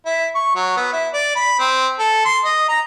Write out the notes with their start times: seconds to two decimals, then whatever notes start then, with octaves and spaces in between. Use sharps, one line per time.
0.06 E4
0.35 C#6
0.56 F#3
0.77 B3
0.93 E4
1.13 D5
1.36 B5
1.60 C4
1.99 A4
2.25 C6
2.45 D#5
2.69 A#5